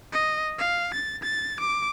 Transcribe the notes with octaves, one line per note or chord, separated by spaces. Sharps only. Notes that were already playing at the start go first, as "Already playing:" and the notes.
D#5
F5
A6
A6
D6